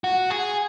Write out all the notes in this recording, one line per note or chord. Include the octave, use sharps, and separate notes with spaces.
F#4
G#4